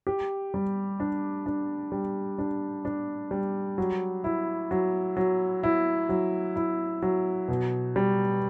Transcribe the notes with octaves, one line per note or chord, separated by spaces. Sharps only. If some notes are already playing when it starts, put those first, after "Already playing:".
G4
G3
D4
D4
G3
D4
D4
G3
F#3
E4
F#3
F#3
E4
F#3
E4
F#3
B2
G3